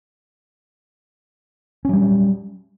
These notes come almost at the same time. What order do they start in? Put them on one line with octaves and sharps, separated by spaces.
C#4 F#3 G3